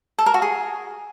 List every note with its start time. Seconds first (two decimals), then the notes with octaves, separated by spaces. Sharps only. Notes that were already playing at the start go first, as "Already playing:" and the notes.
0.18 A4
0.26 A#4
0.34 F#4
0.42 G#4